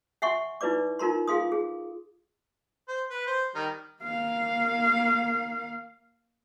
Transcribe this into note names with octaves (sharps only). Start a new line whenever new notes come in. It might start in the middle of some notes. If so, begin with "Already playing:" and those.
E5 F#5 G#5 C6 C#6
D#4 E4 B4 D5 D6
D#4 F4 A#4 A#5 C6
F4 G#4 F5 C6 D#6
G#4
C5
B4
C5
D#3 G3
A#3 F5